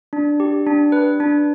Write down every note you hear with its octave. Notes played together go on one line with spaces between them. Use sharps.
D4
G4
D4
B4
D4